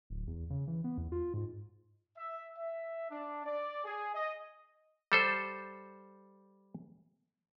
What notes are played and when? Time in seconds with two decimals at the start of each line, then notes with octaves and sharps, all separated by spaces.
0.10 D1
0.27 E2
0.50 C#3
0.68 E3
0.84 B3
0.98 E2
1.12 F4
1.34 G#2
2.17 E5
2.57 E5
3.10 D4
3.45 D5
3.84 G#4
4.15 D#5
5.12 G3 A4 C5